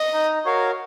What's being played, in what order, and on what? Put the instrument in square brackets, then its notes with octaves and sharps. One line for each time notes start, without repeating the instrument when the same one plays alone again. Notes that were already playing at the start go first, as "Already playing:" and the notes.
Already playing: [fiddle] D#5
[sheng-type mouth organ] D#4
F#4 A#4 C#5 F5